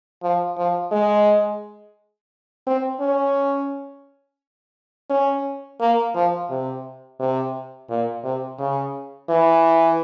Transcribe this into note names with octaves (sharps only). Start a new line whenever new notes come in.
F3
F3
G#3
C4
C#4
C#4
A#3
F3
C3
C3
A#2
C3
C#3
E3